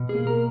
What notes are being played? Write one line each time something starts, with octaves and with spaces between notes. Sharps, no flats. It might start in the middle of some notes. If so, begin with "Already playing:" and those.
Already playing: B2
G#4
A#3
A#4